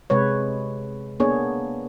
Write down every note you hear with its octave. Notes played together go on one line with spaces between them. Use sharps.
C3 G#3 B4 C#5
A#3 B3 D4 G#4 C#5